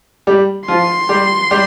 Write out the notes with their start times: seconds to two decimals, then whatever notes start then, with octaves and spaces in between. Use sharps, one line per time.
0.27 G3 G4
0.68 F3 F4 C6
1.09 G3 G4
1.51 G3 G4